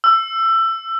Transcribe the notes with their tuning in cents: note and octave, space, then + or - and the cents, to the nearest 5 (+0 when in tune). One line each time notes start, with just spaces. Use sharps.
E6 +20